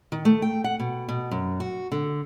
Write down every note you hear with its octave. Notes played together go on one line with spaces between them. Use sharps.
D#3
A3
G5
F#5
B2
B2
F#2
F#4
D3